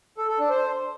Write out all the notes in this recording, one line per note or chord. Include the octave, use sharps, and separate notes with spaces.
A4
A4
D4
C5